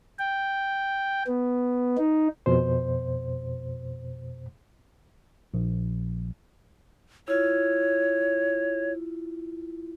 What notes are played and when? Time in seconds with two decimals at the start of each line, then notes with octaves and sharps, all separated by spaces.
0.19 G5
1.27 B3
1.98 D#4
2.46 F2 B2 C5
5.54 A#1
7.28 E4 F4 C#5